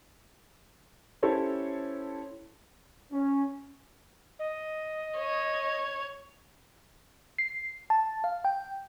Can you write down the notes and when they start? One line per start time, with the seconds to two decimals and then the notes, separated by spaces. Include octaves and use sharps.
1.23 C#4 E4 G4 A4 C5 C#5
3.12 C#4
4.39 D#5
5.18 C#5
7.38 C7
7.90 A5
8.24 F5
8.45 G5